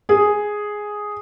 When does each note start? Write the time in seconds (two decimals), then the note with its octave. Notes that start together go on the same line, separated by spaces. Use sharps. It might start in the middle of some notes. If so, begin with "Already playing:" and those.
0.09 G#4